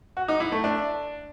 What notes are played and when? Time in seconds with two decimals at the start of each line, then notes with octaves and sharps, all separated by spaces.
0.17 F#4
0.28 D#4
0.40 E4
0.52 A3
0.64 D4